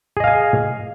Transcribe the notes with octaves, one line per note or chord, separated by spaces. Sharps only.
G#4 D#5 F5 G#5